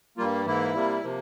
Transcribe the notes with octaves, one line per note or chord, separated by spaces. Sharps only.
G2 G3 A#3 F4
G#2 E3 A#3 E4
C3 G3 A#3
C3 F3 A#3